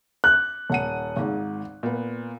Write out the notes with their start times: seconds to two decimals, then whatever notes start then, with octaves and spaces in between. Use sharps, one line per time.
0.24 F#6
0.70 D#1 F#5 D#7
1.16 G#1 G#2
1.83 A#2 B3